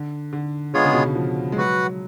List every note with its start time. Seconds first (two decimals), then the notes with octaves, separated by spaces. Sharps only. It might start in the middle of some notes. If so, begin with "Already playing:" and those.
Already playing: D3
0.33 D3
0.74 D3 G#3 B3 F4 G#4 C#5
0.84 C#3
0.93 B2
1.04 C#3
1.15 F3
1.52 G#3
1.57 F#3 F#4 B4 F#5